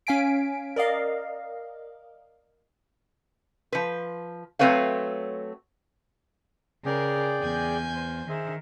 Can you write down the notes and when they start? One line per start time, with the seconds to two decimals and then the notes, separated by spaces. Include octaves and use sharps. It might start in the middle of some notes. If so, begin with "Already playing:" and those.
0.07 C#4 F5 G#5 B6 D7
0.76 A#4 D5 D#5 F5
3.72 F3 B4
4.59 F#3 A3 C4 B4 C#5 F5
6.85 C#3 G#4 A#4 D5 G5
7.41 E2 G#5 G6
7.95 C5
8.29 D#3 G#4 C5 E5